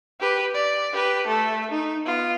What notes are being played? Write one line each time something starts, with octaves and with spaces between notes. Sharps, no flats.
G4 B4
D5
G4 B4
A3 A4
D#4
B3 F4